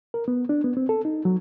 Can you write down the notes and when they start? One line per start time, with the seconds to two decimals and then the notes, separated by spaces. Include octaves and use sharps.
0.14 A#4
0.28 B3
0.49 D4
0.64 B3
0.77 C4
0.89 A4
1.05 D#4
1.25 F#3